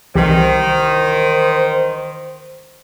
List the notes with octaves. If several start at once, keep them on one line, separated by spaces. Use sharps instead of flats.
C2 D#3 E3 G4 C5